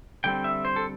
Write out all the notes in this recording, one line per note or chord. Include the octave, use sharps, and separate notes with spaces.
D3 G3 C4 G5
E5
C5
A4